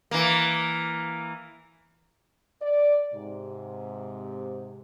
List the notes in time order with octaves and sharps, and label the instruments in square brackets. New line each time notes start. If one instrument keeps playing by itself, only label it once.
[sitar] E3 A#3
[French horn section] D5
G#2 C3